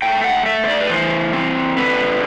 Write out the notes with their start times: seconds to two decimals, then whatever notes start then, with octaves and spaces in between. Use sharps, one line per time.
0.02 A3 G5
0.24 F#5
0.46 A3 E5
0.64 C5
0.68 D5
0.80 B4
0.89 E3 C5
1.33 C4
1.77 D3 B4